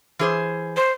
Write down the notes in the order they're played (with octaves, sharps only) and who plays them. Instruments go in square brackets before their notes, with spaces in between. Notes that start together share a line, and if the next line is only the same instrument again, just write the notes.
[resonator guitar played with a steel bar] E3 G#4 C5
[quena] C5